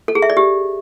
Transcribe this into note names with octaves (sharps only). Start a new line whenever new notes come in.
A4
G#4
E5
D5
G4